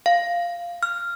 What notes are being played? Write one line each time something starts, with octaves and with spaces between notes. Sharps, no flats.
F5
F6